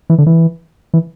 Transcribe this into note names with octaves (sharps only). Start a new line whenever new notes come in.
E3
D3
E3
E3